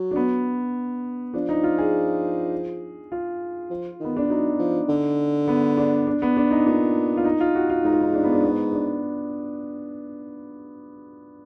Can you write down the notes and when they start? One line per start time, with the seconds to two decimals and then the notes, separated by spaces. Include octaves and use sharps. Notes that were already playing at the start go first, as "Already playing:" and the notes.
Already playing: F#3
0.11 D4
0.16 B3
1.34 F3 D4
1.49 D#4
1.64 F4
1.78 G#4
3.12 F4
3.70 F3
4.00 D#3 B3
4.17 D4
4.29 F#3 D#4
4.59 F3
4.89 D3
5.48 B3
5.77 D4
6.07 D4
6.22 B3
6.37 D4
6.51 D#4
6.66 A#2 D4
7.17 F4
7.25 D#4
7.40 F4
7.55 F#4
7.69 F4
7.84 G#2 D#4
7.93 F4
8.01 D#4
8.13 D4
8.24 B3
8.33 D4
8.44 B3
8.73 D4